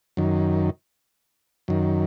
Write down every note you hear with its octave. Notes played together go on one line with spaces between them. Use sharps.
F#2 D#3
F#2 D#3